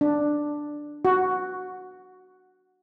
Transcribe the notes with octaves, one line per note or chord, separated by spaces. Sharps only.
D4
F#4